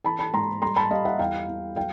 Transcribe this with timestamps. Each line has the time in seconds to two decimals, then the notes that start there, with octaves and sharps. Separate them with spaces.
0.04 E3 A5 B5
0.19 A5 B5
0.34 G#2 A#5 C6
0.62 G3 A#5 C6
0.76 A5 B5
0.90 G3 D#5 F5
1.05 E5 F#5
1.19 E2 F5 G5
1.48 E2
1.76 F#3 F5 G5